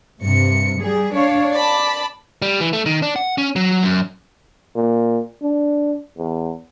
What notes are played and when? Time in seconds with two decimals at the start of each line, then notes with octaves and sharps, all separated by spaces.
0.21 G2 C3 C#7
0.79 G3 G#4
1.14 D4 C#5 F5
1.54 D5 A5 B5
2.42 G3
2.61 E3
2.73 A3
2.86 D#3
3.02 D4
3.16 F#5
3.38 C#4
3.56 F#3
3.83 F#2
4.76 A#2
5.42 D4
6.18 E2